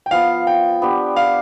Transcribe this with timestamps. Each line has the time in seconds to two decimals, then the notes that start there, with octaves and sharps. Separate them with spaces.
0.06 G5
0.11 F3 B3 F4 F5
0.47 G5
0.82 B3 D4 G4
1.16 F5